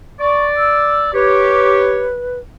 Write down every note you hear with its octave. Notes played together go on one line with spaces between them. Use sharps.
D5 C#6
E6
G4 B4 C#5